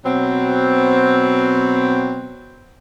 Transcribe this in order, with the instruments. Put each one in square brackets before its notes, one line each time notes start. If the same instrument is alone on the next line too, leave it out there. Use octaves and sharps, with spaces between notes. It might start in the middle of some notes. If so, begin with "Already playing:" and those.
[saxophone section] B2 F#3 C4